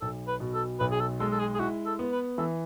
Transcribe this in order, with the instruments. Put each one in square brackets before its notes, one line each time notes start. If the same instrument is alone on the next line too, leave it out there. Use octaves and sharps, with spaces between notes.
[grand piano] B1 [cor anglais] A4
[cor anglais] B4
[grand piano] B2
[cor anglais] A4
[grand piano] B1 [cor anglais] B4
[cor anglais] G#4
A4
[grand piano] G#3 [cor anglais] A4
[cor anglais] A4
G#4
G#4
[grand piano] E4 [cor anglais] F#4
[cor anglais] A4
[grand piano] B3
[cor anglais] B4
[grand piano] E3 [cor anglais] A4